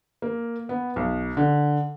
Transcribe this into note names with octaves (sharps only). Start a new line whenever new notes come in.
A#3
B3
B1
D3